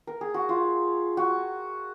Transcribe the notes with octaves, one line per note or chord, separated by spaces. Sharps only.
A#4
G#4
F#4
F4
F#4